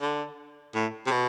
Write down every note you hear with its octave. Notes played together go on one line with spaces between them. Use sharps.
D3
A2
C3
B2